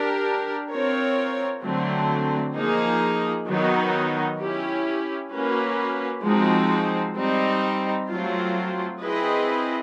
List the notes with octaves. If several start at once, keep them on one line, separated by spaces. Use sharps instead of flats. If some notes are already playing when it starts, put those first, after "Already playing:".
Already playing: D4 G4 A#4
C4 F4 A#4 C#5
D3 F#3 A3 C4
F3 A#3 D#4 G#4
D#3 F#3 B3 D#4 F#4
C#4 E4 G4
A#3 C#4 F#4 B4
F3 G#3 C4 D#4 F#4
G3 C4 D#4
F#3 A3 C4 F4
C4 E4 G#4 B4 D#5